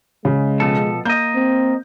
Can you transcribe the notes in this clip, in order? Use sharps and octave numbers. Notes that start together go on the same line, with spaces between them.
C#3 G#3
B2 F3 A4
A#3 D#5 G6
C4